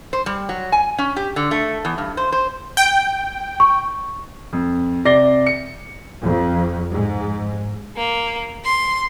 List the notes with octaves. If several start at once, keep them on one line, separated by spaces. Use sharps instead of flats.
C5
G3
F#3
G#5
C#4
G4
D3
A3
E2
G2
C5
C5
G5
C#6
F2
C3 D5 A#6 C7 G7
C#7
F2
G#2
A#3
C6